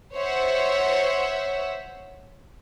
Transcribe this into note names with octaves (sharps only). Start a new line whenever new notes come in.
C5 C#5 E5 F#5